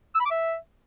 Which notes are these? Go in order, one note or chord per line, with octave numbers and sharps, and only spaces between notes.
E6
B5
D6
E5